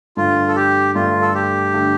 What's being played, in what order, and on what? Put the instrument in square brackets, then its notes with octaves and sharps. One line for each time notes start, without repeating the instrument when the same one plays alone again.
[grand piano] G2 D3 A3 [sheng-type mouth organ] F4
[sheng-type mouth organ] A4
G4
[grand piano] G2 D3 A3 [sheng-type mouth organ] F4
[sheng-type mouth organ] A4
G4
[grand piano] D3 A3